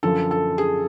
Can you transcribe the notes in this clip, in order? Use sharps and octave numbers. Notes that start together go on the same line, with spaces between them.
F#2 D3 F3 A4
A4
G#4